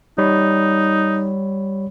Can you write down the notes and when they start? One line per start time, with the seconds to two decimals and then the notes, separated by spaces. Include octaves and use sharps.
0.18 G3 D#4 C#5 B5